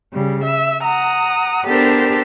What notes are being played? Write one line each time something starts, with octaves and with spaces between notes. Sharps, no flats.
C#3 G3
E5
F#5 A#5 D#6
B3 D4 G4 A4 A#4 C5